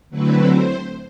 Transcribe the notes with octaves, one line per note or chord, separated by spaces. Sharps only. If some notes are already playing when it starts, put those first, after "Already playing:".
D3 F#3 A3 C4 E4 B4
C5